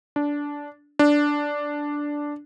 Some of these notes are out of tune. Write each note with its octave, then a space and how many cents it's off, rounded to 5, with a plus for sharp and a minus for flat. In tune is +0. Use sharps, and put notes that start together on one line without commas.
D4 -15
D4 -5